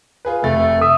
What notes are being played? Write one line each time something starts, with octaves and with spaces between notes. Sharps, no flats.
F4 G#4 B4
F1 A3 A6
E5 D#6